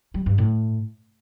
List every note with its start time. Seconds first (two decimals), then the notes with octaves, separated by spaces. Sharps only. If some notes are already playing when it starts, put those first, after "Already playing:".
0.14 G3
0.26 G2
0.38 A2